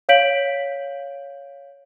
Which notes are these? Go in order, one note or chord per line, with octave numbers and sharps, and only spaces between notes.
C#5 F5 G6 B6 D7 F#7